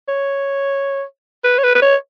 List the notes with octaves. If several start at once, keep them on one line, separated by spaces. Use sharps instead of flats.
C#5
B4
C#5
B4
B4
C#5